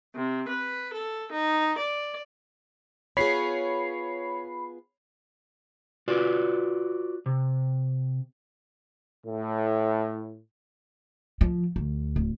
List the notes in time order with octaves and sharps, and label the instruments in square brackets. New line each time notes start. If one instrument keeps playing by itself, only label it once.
[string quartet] C3
B4
A4
D#4
D5
[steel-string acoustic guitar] B3 F4 G#4 [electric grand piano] C#5 [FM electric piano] B5 C7
[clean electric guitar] F4 F#4 B4 D5
C3
[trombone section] A2
[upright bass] F3
D2
D1